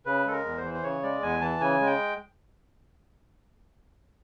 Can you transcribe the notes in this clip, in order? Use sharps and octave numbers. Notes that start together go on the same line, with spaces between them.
C#3 B4
G#3 A4
A#4
E2
C5
E3
C5
C#3 C#5
G#3 D5
E2 G#5
E3 A5
C#3 G#5
G#3
G5